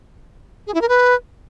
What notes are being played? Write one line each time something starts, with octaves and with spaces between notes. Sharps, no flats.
G#4
E4
A#4
B4